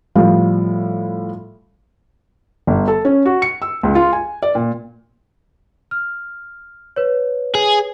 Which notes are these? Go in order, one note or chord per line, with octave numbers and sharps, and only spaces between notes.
A2 F3 G3 F5
G1
A4
C#4
F#4
C#7
E6
C#2
F4
G#5
D5
A#2
F6
B4 C#5
G#4